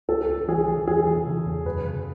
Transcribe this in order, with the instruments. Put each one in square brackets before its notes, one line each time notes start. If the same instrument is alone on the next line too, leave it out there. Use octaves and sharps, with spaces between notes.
[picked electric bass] C#2 [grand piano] A4
[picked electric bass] C#2
[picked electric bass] E3 [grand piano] G#4
[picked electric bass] E3
[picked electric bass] E2 [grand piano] G#4
[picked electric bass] E3
C#3
E2
[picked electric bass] F#2 [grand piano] B4
[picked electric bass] C#3